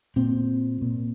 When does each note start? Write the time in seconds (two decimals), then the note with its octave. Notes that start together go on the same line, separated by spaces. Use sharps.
0.16 A#2 C4
0.81 A#2